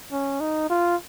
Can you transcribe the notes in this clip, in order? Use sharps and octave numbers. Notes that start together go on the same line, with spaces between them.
C#4
D#4
F4